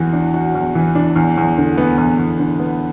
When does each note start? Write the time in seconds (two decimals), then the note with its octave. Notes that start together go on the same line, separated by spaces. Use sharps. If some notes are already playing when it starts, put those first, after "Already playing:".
Already playing: E2 E3 F#4
0.13 D4
0.34 F#4
0.55 E2
0.75 E3
0.95 D4
1.16 E2
1.37 E2
1.58 D3
1.78 B3
1.98 E2
2.19 E2
2.39 D3
2.59 B3